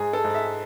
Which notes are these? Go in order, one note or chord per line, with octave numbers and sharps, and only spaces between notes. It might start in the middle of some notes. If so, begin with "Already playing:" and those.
Already playing: G#2 G#4
A4
G#2
E5